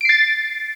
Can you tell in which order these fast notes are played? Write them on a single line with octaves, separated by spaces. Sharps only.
D7 C7 A6